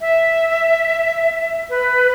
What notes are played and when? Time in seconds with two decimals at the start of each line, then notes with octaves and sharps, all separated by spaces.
0.01 E5
1.70 B4